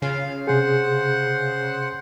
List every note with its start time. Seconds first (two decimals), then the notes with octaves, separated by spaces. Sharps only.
0.02 C#3 F4 F5
0.47 C3 G#4 C5 F#5